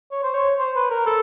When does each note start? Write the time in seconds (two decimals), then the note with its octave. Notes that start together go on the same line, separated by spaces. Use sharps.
0.12 C#5
0.23 C5
0.34 C#5
0.59 C5
0.76 B4
0.90 A#4
1.06 A4